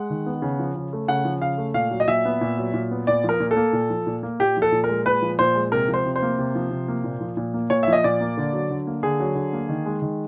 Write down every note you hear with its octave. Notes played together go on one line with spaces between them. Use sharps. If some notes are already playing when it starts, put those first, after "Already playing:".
Already playing: G#3 F#5
D#3
B3
C#3
F3
C#3
A3
C#3 F#5
F3
C#3 F5
A3
A#2 F5
F#3
D#5
A#2 E5
B3
A#2
F#3
A#2
B3
A#2 D5
F3 A#4
A#2
A4
A#3
A#2
F3
A#2
A#3
A#2 G4
F3
A4
A#2
A#4
G#3
A#2 B4
F3
A#2 C5
G#3
C3 A#4
F3
C5
C3
C5
A#3
C3
F3
C3
A#3
A#2
F3
A#2
A#3
A#2 C#5
F3 E5
D#5
A#2 D5
A#3
D3
F#3
D3
A#3
D3 G#4
F#3
D3
A#3
D#3
G#3
D#3